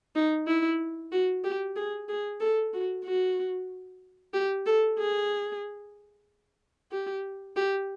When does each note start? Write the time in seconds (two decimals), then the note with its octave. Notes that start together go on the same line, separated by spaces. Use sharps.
0.16 D#4
0.47 E4
1.12 F#4
1.44 G4
1.76 G#4
2.09 G#4
2.41 A4
2.74 F#4
3.05 F#4
4.34 G4
4.66 A4
4.98 G#4
6.92 G4
7.56 G4